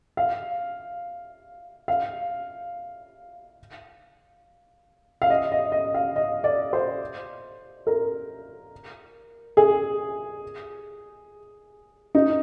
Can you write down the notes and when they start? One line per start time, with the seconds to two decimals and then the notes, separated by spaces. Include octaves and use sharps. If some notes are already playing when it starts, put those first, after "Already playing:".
0.17 F5
1.88 F5
5.22 F5
5.30 D#5
5.52 D#5
5.72 D#5
5.94 F5
6.16 D#5
6.44 D5
6.73 C5
7.87 A#4
9.57 G#4
12.15 D#4